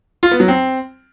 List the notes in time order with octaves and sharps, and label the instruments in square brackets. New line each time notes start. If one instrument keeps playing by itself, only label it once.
[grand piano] F4
B3
F#3
C4